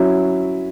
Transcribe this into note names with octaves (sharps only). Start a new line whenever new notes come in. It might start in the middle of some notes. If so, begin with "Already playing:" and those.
Already playing: F#3 C#4 E4